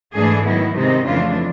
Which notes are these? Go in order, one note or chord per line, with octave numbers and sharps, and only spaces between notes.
G#2 E3 A3 D4 G#4
D#3 F#3 B3 E4
C3 D#3 G#3 C4 D#4
F2 C#3 E3 A3 D4 F4